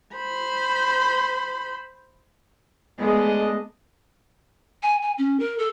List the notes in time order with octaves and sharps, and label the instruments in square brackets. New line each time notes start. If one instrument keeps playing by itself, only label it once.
[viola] C5 B5
[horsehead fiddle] G#3 A3 [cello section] B3 [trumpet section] D4 D#5
[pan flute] G#5
G#5
C#4
A#4
A4